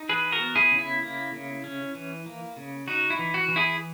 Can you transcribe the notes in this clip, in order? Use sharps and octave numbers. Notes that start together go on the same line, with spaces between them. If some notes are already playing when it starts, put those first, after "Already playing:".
Already playing: D#4
E3 G#4 B4
F#4 A#4
B3
E4 G#4
C#3
E4
A#3
C#3
C#4
E3
A#3
C#3
D#4 F#4
E4
E3
F#4
E3
E4 G#4